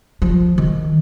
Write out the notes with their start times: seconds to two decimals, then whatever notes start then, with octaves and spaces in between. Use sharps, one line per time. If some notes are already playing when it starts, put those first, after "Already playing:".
0.22 F3
0.58 D#3